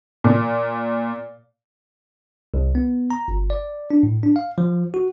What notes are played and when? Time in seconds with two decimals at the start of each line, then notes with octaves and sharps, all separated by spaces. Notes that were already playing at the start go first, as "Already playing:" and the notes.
0.24 A#2
2.54 C2
2.75 B3
3.10 A#5
3.28 G1
3.50 D5
3.91 D4
4.03 A2
4.23 D4
4.36 F5
4.58 F3
4.94 F#4